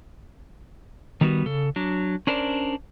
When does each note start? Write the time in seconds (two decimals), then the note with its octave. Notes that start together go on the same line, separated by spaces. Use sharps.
1.21 D#3 G3 B3 F#4
1.46 C#3 A4
1.76 F#3 D4
2.27 C#4 D4 A#4 C5 D5